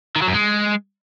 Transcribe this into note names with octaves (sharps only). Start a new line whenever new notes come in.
D#3
F#3
F#2
G#3